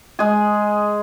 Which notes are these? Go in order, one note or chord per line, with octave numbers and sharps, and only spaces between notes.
G#3 G#4